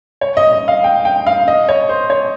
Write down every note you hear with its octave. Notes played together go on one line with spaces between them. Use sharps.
C#5
D#5
D#5
F5
G5
G5
F5
D#5
C#5
C5
C#5